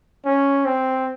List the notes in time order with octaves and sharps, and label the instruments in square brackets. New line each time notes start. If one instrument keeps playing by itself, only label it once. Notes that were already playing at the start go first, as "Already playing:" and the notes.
[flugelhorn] C#4
C4